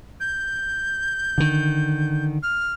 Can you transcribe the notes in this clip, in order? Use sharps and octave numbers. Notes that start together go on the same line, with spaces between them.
G6
D3 D#3
F6